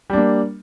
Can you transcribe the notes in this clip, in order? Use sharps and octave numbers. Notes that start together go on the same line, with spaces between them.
G3 A#3 D4